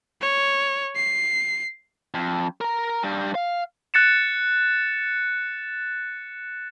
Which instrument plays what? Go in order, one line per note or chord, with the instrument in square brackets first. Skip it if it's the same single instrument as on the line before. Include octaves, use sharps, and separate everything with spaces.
[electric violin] C#5
C7
[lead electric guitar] F2
A#4 A#5
G2 G3
F5
[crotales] F#6 A6 C#7 E7